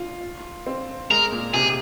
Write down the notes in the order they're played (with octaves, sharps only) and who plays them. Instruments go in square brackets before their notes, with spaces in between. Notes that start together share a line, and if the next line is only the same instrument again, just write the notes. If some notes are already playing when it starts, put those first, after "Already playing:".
Already playing: [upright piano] F4
C4
[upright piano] G#3 [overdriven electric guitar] A#4
[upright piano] A#2
[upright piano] C3 [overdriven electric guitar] G#4